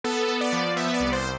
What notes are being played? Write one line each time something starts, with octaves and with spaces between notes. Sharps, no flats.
B3 A4
B3
D5
F3
B3 E5
D5
C2
C5